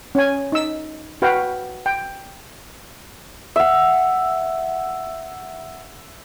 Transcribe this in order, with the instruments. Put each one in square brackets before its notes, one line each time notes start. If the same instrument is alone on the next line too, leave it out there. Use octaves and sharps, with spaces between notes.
[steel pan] C#4 G#5
D#4 E6
F#4 B4 F5 G5
G5
[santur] E5 F#5